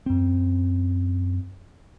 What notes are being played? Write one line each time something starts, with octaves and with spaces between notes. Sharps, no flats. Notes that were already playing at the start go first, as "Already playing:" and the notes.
F#2 C4